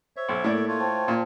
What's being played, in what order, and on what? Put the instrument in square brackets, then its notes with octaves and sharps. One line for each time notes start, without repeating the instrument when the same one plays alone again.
[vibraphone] C5 [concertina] C#5 E5
[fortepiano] B1
[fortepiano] A2 D5 [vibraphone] A#3 A4 A#4
[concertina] A3 F4 C#5
[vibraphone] C5 G5 A5
[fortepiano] A#2